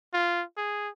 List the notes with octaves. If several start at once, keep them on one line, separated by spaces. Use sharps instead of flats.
F4
G#4